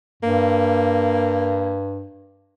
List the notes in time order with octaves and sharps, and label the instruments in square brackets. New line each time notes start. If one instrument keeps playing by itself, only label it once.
[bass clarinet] G2 [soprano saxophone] A#3